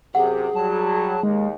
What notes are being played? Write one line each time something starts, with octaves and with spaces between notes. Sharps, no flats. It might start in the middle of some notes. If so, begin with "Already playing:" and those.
F#2 C3 G4 G#4 F#5
F#3 G3 A5
D#2 G#3